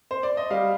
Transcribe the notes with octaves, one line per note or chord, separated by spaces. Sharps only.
C5
D5
D#5
G3 F5